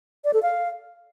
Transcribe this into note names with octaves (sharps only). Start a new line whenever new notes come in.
D5
A4
F5